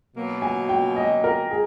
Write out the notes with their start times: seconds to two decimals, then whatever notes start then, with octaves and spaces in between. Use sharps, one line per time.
0.15 B2 F#3 A#3
0.42 G#5
0.69 G5
0.96 D#5
1.24 A#4
1.51 G#4